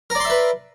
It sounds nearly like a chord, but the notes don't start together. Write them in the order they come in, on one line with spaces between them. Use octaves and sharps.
A#4 D5 C6 E5 B4